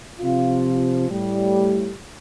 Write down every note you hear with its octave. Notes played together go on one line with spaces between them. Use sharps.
C3 F3 F4
A2 G3